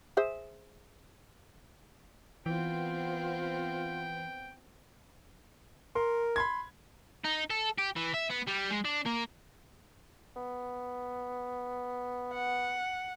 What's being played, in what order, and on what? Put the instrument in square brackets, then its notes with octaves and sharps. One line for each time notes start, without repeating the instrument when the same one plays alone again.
[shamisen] G#4 C5 E5
[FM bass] E3 [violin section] B3 C4 [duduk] F4 [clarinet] G5
[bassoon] A#4 [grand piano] C6
[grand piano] B5 C6 G#6
[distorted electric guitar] D#4
A4
G4
E3
E5
B3
G3
G#3
D4
A#3
[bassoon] B3
[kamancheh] F#5